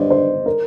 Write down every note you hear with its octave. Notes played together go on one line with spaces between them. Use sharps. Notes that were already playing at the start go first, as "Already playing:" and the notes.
Already playing: G2 C5 D5 D#5
C5
A#4